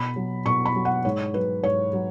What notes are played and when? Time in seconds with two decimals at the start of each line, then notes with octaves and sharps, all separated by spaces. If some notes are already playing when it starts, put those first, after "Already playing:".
Already playing: B2 B5
0.16 F#3
0.46 B2 C#6
0.65 B5
0.75 F#3
0.85 F#5
1.05 G#2 C#5
1.34 F#3 B4
1.63 G#2 C#5
1.93 F#3